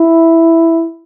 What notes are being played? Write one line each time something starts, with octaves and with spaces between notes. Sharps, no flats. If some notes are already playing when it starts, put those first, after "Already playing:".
Already playing: E4